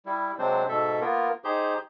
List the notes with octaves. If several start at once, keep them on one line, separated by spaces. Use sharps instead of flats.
G3 E4
C3 F#3 G#3 C4 D4 C5
G#2 B2 A4 E5
A#3 B3 F4 A#4
D#4 G4 G#4 C5 G6